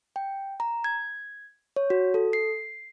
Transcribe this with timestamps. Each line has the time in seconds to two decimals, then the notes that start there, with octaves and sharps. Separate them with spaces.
0.16 G5
0.60 A#5
0.84 G#6
1.76 C#5
1.90 F#4
2.14 A4
2.33 C7